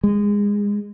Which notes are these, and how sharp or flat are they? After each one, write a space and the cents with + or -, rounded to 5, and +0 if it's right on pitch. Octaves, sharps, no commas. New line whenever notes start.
G#3 -20